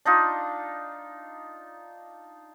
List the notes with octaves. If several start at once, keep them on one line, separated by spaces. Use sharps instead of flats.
D4 D#4 F4